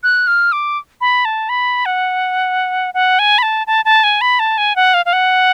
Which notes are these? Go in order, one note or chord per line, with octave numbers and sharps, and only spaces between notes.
F#6
F6
D6
B5
A5
B5
F#5
F#5
G#5
B5
A5
A5
A5
G#5
B5
A5
G#5
F#5
F5
F5
F#5